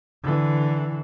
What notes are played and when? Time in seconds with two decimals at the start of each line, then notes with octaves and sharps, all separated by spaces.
0.23 D3 E3